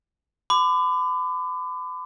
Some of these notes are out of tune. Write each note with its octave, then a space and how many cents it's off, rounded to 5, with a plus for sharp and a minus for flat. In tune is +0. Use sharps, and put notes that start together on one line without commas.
B5 +40 D6 +20